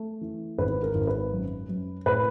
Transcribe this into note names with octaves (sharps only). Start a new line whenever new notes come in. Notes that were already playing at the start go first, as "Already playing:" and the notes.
Already playing: A3
E3
G#1 B4
A#4
G#1
B4
F#2
F#2
A2 B4